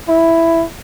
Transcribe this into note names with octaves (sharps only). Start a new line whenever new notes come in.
E4